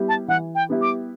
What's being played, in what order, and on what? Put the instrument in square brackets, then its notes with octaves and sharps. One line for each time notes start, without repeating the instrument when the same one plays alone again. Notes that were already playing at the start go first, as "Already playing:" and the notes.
Already playing: [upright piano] G3 B3 E4 G4
[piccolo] A5
[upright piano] E3 [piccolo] F#5
[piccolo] G5
[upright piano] G3 B3 E4 G4
[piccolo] D6